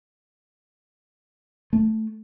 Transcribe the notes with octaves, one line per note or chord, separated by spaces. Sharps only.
A3